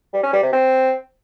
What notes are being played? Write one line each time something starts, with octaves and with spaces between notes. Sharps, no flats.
G3
C#4
G3
C3
C4